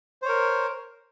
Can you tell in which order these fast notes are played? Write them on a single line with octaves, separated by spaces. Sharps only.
C5 C#5 A#4